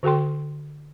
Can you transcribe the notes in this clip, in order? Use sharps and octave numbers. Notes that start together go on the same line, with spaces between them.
D3 F#4 A4 G5 C6